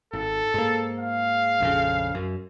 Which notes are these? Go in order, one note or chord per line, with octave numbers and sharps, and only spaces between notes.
G#1 A4
G#2 A#3
F5
A#1 F2 C#3
F#2